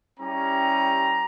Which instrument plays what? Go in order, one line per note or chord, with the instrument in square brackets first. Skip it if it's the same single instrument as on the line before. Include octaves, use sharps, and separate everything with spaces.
[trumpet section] G3 C#4 E4 G4 A#5